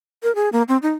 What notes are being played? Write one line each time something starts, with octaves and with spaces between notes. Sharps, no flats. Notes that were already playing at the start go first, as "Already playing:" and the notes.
A#4
G#4
A#3
C4
D#4